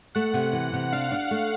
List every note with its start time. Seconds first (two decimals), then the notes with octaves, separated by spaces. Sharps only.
0.15 A3 F#5
0.34 C3
0.53 E3
0.73 C3
0.92 D4 F5
1.11 D4
1.31 A3